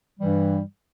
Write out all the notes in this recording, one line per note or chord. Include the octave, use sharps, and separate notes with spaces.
G2 E3 G3